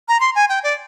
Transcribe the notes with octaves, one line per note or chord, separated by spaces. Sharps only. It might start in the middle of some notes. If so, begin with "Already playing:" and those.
A#5
C6
G#5
G5
D5